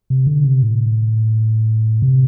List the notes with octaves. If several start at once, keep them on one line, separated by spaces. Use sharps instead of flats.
C3
D3
C3
A2
C3